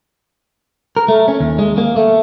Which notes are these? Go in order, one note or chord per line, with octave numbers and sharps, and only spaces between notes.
A#4
A3
C#4
D#2
G#3
A#3
A3